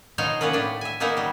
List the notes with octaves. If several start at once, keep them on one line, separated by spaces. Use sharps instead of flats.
B2 F3 D#4 C5 C#5 F5
A#3 B3 C#4 A#4 B4
A2 D4
E5 G#5
A#3 B3 D#4 G#4 A#4 E5
F#3 G3